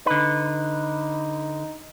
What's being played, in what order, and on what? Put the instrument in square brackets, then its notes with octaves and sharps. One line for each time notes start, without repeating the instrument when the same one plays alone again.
[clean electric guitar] D3 B4 [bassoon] D#4